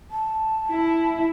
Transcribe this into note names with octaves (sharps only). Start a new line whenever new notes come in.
A5
E4